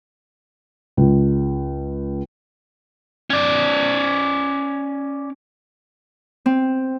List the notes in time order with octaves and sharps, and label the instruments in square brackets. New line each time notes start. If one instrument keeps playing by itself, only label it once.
[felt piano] C#2
[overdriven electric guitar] C#4 D5
[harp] C4